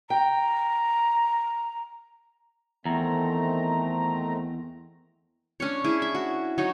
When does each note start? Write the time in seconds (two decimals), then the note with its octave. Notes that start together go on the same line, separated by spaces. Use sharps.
0.10 G5 A#5
2.85 E2 D#3 A3 C4 A#5
5.60 C#4 D4 C#5
5.84 E4 G#4
6.02 E5
6.15 F#4
6.58 F#3 D#4 C#5